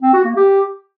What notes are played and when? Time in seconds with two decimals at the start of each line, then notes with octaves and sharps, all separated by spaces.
0.02 C4
0.14 F#4
0.25 A#3
0.36 G4